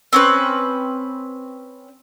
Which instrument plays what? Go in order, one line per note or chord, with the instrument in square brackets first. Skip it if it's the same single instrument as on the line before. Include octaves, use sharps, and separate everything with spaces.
[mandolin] C4 C#4 B4